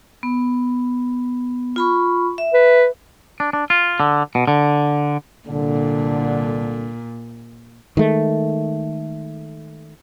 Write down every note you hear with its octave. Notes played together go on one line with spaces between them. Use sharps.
B3
F4 B5 C#6
E5
B4
D4
D4
F4
D3
B2
D3
C2 A#2 D3
D#3 G#3 A3